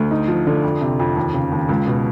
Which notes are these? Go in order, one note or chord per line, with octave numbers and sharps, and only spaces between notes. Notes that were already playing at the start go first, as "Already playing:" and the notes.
Already playing: D2
D#4
F3
D3
F2
C3
F2
D#2
C#3
D#2
C#2
B2